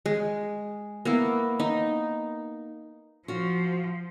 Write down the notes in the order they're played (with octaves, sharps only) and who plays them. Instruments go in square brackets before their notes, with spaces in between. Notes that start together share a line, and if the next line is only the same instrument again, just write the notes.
[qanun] G#3
A#3 B3 E4
D#4
[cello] F3 [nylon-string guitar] F4 F#4